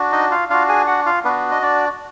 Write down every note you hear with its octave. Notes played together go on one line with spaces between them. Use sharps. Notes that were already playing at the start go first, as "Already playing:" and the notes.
Already playing: D4 F#4
D#4 D#5
F4 F5
D4 F4 F#4 F5
G#4 G#5
F#4 F#5
F4 F5
B3 D4 F#4 B4
D#5
D4 D5